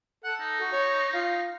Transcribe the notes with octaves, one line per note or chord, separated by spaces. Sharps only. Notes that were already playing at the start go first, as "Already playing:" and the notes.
A4 F#5
D#4
F#4
C#5
F4